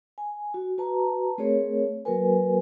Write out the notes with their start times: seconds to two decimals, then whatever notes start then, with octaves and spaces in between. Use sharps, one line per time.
0.18 G#5
0.54 F#4
0.78 F#4 B4 A5 A#5
1.38 A3 C4 G#4 A#4 C#5
2.05 F#3 A#3 F#4 A#4 B4 G#5